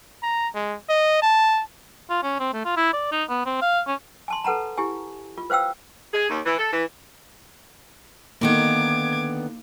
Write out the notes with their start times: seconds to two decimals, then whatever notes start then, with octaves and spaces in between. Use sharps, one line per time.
0.23 A#5
0.55 G#3
0.89 D#5
1.22 A5
2.10 F4
2.23 C#4
2.40 C4
2.53 A3
2.65 F4
2.77 E4
2.94 D5
3.12 D#4
3.29 B3
3.46 C4
3.62 F5
3.87 C#4
4.28 G#5 A5 C6
4.44 A4 B4 F#5 A5 A#5
4.78 E4 G4 G#5
5.38 F4
5.50 B4 C5 F5 G5 E6
6.14 G#4
6.29 D#2
6.46 E3
6.58 A4
6.73 E3
8.41 D3 D#3 A#3 B3 D#4 D6 G#6